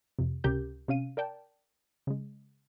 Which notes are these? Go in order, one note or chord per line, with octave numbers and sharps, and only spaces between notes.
F2 C3
C#2 C3 C#4 G4 A#4 G6
C3 C#4 F5 D#7
A#4 D5 G5 A5
C#3 G#3